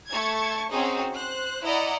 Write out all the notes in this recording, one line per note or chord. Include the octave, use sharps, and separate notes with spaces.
A3 A5 C#6 G#6
C4 C#4 D#4 F#4 G#4
C5 F#6
E4 D5 D#5 F#5 A#5